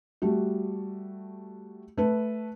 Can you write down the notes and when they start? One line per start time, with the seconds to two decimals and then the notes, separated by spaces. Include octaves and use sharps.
0.22 G3 A3 F#4
1.97 A3 B4